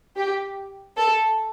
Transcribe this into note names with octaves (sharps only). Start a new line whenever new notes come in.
G4
A4